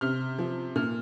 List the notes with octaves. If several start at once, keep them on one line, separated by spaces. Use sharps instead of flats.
C3 F6
F3
A#2 F6